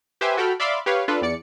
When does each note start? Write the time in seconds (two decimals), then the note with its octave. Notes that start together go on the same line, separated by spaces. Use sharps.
0.21 G4 B4 C5 E5 G#5
0.37 F#4 A4 G5 B5 F6
0.60 D5 E5 F5 B5 C6 D6
0.86 G4 B4 C#5 F5
1.08 D4 F4 A4 B4
1.21 E2 D5 C#7